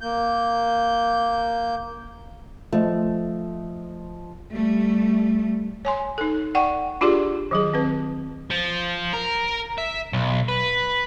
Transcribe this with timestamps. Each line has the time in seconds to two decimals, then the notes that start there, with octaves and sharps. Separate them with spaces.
0.01 A#3 G6
2.72 F3 A3 C5 D#5
4.53 G3 A3
5.85 C#5 G#5 C6
6.18 D#4 A4
6.55 D5 F#5 G5 C#6
7.01 D4 F4 G4 G#4 D5 C6
7.51 D#3 F#3 G#4
7.74 C4 B4
8.51 F3
9.14 A#4
9.78 E5
10.13 B1
10.48 B4